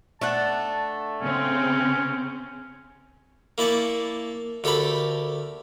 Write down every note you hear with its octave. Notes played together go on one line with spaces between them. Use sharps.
A3 D4 F#5 A5
C#3 C4 C#4
A#3 E4 D5 A5 C#6
D2 G4 A4 A#4 B5